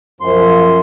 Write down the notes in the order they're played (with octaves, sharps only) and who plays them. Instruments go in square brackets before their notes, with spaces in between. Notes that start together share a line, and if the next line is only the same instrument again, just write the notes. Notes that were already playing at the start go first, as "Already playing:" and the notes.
[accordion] F#2 C6 [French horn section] F3